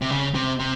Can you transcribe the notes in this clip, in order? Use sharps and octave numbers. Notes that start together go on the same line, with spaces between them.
C3
C#3
C3
C3